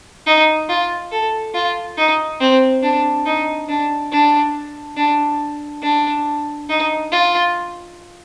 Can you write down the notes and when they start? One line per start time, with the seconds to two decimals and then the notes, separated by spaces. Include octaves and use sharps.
0.26 D#4
0.69 F4
1.11 A4
1.54 F4
1.97 D#4
2.40 C4
2.83 D4
3.25 D#4
3.68 D4
4.12 D4
4.97 D4
5.83 D4
6.69 D#4
7.12 F4